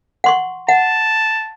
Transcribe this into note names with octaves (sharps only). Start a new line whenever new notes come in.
F#5 C6 C#6
F#5 A5